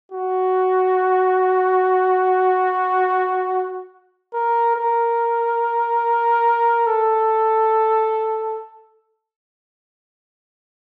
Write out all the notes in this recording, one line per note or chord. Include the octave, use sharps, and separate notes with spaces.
F#4
A#4
A#4
A4